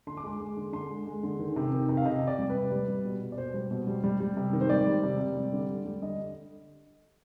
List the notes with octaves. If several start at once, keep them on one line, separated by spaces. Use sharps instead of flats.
D3 C6
D6
G#3 C6
G#3
D3
D3 C6
G#3
G#3
D3
D#3
C3
D#3
C3
F5
C3 D#5
C3
D5
G3
B4
C3
G3
G3
B2
B2
D5
B2 C5
G3
B2
G3
G3
G3
C3
D#3
C5
G3 D5
G3
C3
C3
G3
D3
G3
G3
D3 D#5